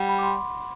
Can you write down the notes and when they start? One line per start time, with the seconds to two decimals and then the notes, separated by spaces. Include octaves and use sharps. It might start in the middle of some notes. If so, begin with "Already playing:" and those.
Already playing: G3 F#5
0.09 B5
0.19 D6
0.23 C6